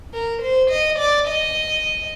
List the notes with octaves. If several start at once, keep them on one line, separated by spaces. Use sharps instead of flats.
A#4
C5
D#5
D5
D#5